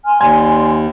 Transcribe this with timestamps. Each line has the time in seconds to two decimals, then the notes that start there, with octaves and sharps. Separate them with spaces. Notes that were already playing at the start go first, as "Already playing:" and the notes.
0.06 G#5 C6 F6
0.21 D#2 D5 G#5 C6